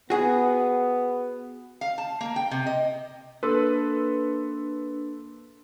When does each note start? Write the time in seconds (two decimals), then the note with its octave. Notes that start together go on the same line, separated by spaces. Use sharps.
0.10 B3 F#4 G#4
1.81 F5
1.98 A5
2.21 A#3
2.36 G5
2.51 C3
2.66 D#5
3.43 A#3 D4 A4 B4 C6 E6